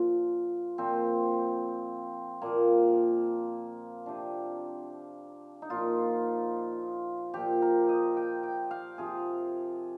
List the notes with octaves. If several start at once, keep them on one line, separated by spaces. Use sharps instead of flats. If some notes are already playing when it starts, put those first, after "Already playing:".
Already playing: A#2 F3 F4
A#2 F3 C4
A#2 F3 A#3
C3 F3 D4
D#4
A#2 F3 F4
A#2 F3 G4
A#4
D#5
G5
G5
F5
C3 F3 G#4